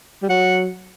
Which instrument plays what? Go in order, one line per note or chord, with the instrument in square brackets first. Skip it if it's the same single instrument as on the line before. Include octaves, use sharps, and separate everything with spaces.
[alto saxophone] G3
[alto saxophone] F#3 [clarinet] F#5